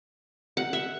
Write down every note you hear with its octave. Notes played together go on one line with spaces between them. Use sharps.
F#5
E5